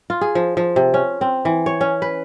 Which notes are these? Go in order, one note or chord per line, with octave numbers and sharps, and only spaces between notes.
F4
G#4
F3
F3
C3
C#4
C4
E3
C#5
C#4
B4